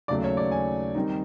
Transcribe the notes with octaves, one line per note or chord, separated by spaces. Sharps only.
D#2 C#3 F#3 A3 D5
C#5
D5
G#5
D#3 G3 C4 D#4